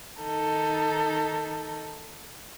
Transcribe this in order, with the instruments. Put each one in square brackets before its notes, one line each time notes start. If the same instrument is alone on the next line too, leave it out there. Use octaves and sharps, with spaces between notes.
[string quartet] D#3 D#4 A4